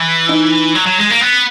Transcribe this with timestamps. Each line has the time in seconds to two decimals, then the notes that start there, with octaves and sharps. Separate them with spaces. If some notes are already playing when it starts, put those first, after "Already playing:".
Already playing: E3
0.29 D#4
0.75 F#3
0.86 F#3
0.98 G#3
1.10 A#3
1.21 B3